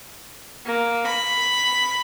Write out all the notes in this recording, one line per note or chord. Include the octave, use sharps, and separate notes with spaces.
A#3
B5